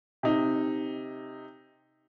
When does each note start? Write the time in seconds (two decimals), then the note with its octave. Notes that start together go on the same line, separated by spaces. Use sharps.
0.23 C3 D#4